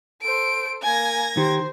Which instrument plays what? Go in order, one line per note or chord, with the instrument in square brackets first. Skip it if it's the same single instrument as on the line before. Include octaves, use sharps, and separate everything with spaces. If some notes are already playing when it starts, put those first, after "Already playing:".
[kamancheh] A4 C5 [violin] D7
[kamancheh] A#3 G#5 [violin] G#6 A#6
[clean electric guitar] D#3 G4 [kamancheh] C5